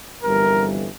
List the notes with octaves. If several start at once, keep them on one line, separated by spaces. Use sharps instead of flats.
G1 F2 E3 G3 A#4